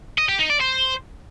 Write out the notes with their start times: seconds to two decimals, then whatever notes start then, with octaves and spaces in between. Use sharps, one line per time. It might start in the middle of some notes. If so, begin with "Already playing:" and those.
0.18 D#5
0.29 G4
0.39 D#4
0.50 D5
0.60 C5